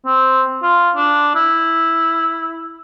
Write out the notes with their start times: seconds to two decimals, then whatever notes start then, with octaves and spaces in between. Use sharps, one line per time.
0.06 C4
0.63 F4
0.96 D4
1.35 E4